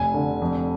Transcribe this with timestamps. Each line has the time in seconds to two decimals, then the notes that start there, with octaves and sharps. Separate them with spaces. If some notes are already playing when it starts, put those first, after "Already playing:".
Already playing: F1 G#5
0.14 D3
0.42 F2